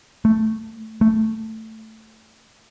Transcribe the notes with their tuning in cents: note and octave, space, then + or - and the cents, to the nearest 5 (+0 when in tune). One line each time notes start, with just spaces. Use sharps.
A3 +5
A3 +5